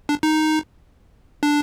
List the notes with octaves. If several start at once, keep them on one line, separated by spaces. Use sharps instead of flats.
D4
D#4
D4